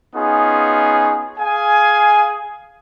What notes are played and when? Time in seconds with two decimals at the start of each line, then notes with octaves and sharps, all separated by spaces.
0.14 B3 C#4 D#4 F4 G#4
1.38 G#4 F5 G#5